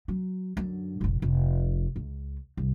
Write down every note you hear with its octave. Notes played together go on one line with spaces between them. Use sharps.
F#3
F#2 D3
F1 A#1
F1
C#2
C2